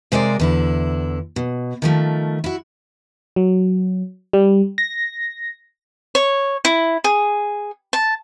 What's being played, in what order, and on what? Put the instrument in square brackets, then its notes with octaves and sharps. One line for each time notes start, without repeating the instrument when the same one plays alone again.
[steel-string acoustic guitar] C3 G#3 C4 A#4 D5
E2 D3 E4
B2
D#3 F3 A3
E4 F#4
[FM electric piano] F#3
G3
A#6
[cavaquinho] C#5
E4
G#4
A5